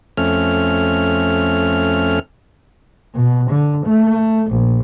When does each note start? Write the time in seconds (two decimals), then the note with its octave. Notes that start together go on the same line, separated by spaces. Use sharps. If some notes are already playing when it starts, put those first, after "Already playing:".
0.17 F2 A3 C#4 F6
3.15 B2
3.49 D3
3.85 A3
4.50 A#1